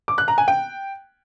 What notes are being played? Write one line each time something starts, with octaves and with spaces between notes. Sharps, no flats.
D6
F#6
A#5
G#5
G5